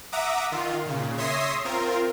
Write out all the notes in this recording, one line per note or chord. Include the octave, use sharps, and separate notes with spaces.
E5 F#5 A#5 D6 D#6
D#3 F4
A#2 C#3
C#5 E5 C6 D#6 A#6 C7
C4 F4 A#4